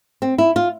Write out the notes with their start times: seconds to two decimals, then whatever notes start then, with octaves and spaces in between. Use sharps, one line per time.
0.22 C4
0.38 E4
0.56 F4